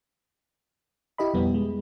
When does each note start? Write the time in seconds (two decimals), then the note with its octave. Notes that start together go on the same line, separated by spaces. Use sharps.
1.18 E4 G4 D#5 B5
1.34 F2 B2 G3 B3
1.54 G#3